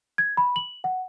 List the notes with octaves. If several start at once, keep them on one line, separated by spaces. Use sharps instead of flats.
G#6
B5
F#7
F#5